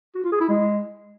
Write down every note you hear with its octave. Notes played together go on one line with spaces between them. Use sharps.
F#4
F4
G#4
E4
G#3